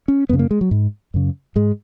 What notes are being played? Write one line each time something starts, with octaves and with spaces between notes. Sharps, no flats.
C#4
F#2 C#3 B3
A#3
G#3
F#3
G#2
F#2 C#3
G#2 G#3